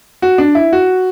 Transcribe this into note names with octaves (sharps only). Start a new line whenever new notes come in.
F#4
D4
E4
F#4